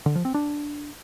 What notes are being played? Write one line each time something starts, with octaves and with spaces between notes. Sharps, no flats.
D3
F3
C4
D4